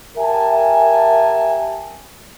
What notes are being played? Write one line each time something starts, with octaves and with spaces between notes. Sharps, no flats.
G4 A#4 E5 G#5 A5